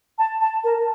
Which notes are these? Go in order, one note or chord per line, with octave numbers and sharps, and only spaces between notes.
A5
A5
A#4